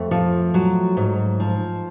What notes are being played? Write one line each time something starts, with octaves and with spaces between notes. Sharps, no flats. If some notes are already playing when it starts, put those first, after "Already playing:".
Already playing: F2 A3
F3
F#3
G#2
F3